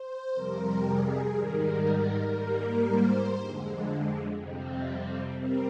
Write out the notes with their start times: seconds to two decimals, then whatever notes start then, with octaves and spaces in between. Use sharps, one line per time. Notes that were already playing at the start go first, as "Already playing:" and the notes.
Already playing: C5
0.34 F2 C3 G3 A#4
0.84 G#4
1.34 G#2 D#3 G3 A#4
2.36 G#2 G3 A#3
2.86 C5
3.36 F2 D3 G#3
4.38 F2 C3 G3 C4
5.38 G3 C4 A#4